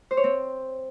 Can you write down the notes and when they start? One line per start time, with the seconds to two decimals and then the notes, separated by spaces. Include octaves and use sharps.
0.11 C5
0.17 C#5
0.24 C4